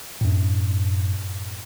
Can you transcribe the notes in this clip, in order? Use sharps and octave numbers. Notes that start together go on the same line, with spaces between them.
F#2 A2